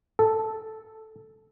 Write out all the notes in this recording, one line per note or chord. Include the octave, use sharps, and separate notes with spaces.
A4